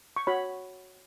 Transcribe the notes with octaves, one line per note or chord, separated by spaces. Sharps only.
C#6
F#4 C#5 B5